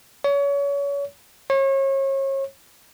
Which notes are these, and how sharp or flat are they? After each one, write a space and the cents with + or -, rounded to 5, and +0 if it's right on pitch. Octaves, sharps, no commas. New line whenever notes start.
C#5 +30
C#5 -35